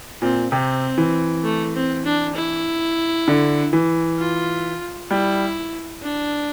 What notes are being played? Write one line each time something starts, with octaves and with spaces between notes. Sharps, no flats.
A#2 C4
C3 C4
E3
A3
C4
D4
E4
D3
E3
F4
G3 E4
D4